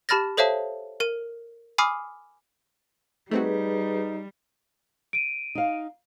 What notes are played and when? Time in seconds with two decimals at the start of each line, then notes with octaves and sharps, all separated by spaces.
0.09 G4 A5 B5 F6 A6 A#6
0.37 A4 C5 C#5 E5 F5 A5
1.00 A#4 D#7
1.78 G#5 B5 D6 D#6 F6 C7
3.31 G3 A3 C4 D#4 F#4 G#4 B4
5.13 D7 D#7
5.55 D#4 F5